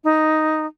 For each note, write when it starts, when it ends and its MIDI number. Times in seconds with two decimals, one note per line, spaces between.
0.04 0.66 63